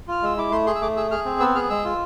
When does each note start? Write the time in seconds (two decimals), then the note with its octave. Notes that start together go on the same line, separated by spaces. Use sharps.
0.08 F4 F6
0.23 G#3 E6
0.37 E4 D6
0.51 A3 C6
0.66 G#4 C6
0.75 E6
0.81 A3 D6
0.96 G#4 E6
1.11 G#4 F6
1.25 C4
1.40 B3 E6
1.55 G#4 F6
1.70 G#3 E6
1.85 F4